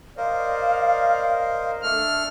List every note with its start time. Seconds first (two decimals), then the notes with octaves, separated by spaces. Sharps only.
0.17 A#4 C5 D5 D#5 F5
1.83 A3 D4 A4 F6